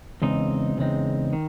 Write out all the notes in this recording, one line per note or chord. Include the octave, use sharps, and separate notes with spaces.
E2 C#3 G#3 C4 D#4
E2 C#3 G#3 C4 D#4
D#3